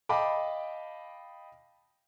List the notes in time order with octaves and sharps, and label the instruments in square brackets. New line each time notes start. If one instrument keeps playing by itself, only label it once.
[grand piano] D#5 F5 G5 A5 B5 D6